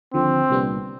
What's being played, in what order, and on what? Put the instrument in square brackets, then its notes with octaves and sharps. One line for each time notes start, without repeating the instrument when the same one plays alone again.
[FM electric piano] D#2 D3 F3 [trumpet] C4
[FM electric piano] C2 A#2 G3 B3 D4